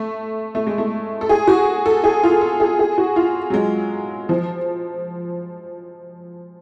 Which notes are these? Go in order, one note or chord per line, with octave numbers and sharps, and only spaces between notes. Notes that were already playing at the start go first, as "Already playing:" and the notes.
Already playing: A3
A3
G#3
A3
A4
G#4
F#4
A4
G#4
F4
A4
G#4
G#4
F#4
F4
F#3
G#3
F3